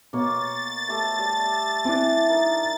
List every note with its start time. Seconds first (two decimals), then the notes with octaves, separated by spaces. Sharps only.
0.13 B2 A#3 C#5 A6
0.88 A3 G4 A4
1.19 G3
1.85 E3 C4 D4 E4
2.29 D#4 A#4